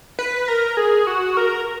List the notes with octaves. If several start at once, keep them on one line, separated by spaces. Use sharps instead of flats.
B4
A#4
G#4
F#4
A#4